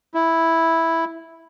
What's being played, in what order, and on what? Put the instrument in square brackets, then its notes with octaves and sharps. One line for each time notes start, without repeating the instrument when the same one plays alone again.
[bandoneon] E4